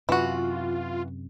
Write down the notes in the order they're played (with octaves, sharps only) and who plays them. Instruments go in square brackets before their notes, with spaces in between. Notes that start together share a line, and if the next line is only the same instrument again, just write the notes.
[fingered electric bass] F#2 C3 [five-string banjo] E3 F#4 [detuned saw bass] F4